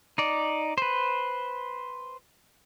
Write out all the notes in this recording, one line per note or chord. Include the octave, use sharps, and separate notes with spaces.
D#4 D5
B4 C5